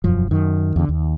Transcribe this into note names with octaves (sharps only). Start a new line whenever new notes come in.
E1 F#2 F3
F#2 D#3
E2 D3
D#2